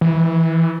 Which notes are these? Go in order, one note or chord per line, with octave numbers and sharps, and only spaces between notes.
E3